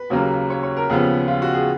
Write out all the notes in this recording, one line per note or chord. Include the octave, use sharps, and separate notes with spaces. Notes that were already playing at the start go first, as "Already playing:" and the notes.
Already playing: B4
D#2 C#3 F#3 A#3
C#5
C#5
A#4
D#2 C#3 F3 B3 G#4
F4
F#4
G#4